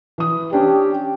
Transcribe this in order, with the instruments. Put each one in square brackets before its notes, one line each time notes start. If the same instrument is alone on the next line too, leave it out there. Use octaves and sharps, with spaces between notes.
[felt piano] E3 D#6
[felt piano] C#4 D4 [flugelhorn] G4